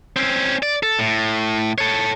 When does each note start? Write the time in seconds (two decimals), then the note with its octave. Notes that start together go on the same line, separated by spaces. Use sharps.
0.16 C4 C#4
0.63 D5
0.83 A4
0.99 A2
1.78 A4 C#5